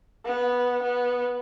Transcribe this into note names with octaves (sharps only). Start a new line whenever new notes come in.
B3
B3